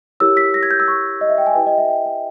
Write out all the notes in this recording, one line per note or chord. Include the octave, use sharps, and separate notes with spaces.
E4 G4 A#4 C#5 E6
B6
A#6
G#6
G6
E6
C#6
D#5
E5
G5
G#5
E4 G4 B4 G5
D#5
E5
G5
E5